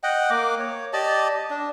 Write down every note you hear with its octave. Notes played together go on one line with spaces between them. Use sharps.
D#5 F#5 G5
A#3 D6
C#5
G4 D5 D#5 A5
D4